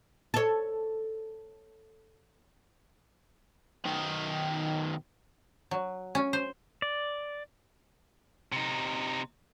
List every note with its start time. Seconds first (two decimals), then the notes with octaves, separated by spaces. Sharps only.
0.34 A4 C#5
3.85 B1 D#3
5.71 F#3
6.15 C#4
6.33 C5
6.82 D5
8.52 C3 D#4